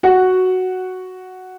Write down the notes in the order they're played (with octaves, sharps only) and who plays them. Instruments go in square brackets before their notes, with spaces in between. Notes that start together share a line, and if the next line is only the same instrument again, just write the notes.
[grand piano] F#4 F#5